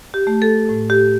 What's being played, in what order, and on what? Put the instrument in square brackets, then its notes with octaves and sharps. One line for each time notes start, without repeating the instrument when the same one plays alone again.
[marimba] G4
A3
A4
A2
G4